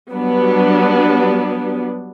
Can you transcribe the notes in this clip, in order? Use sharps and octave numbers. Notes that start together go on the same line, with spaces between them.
F#3 G3 B3 D4